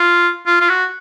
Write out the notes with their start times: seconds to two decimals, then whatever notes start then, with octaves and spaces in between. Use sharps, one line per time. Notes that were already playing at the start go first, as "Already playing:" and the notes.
Already playing: F4
0.46 F4
0.61 F4
0.69 F#4